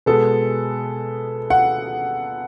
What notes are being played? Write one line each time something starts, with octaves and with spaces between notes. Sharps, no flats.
B2 G#3 B3 A4
F#5